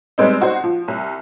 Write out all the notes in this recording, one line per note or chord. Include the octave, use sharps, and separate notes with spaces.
G3 G#3 B3 C4 D#4
D#4 F#4 C5
F3
C2